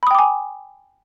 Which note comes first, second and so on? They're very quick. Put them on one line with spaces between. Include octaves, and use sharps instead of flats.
B5 D#6 G5 D6 G#5